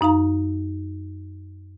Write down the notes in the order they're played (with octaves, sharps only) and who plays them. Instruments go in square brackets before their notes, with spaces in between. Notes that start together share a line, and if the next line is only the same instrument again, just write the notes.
[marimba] F#2 D#4 F5 A#5